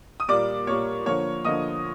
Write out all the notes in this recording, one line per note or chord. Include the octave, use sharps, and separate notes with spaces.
D#6
A#2 G3 A#3 D5 D6
A#2 G3 A#3 C#5 C#6
D3 F3 A#3 C#5 C#6
D3 F3 A#3 D#5 D#6